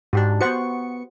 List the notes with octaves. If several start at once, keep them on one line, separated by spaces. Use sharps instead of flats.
G#2 D4 F#4 G4
B3 F#4 C5 F#5 C#6 C#7